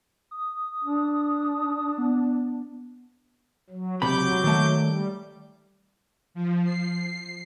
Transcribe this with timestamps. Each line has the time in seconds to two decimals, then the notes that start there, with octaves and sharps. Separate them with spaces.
0.31 D#6
0.84 D4
1.98 B3
3.70 F#3
4.02 C#2 C3 F#3 B5 D6 G6
4.44 D#3 A3
4.81 G3
6.34 F3
6.64 C7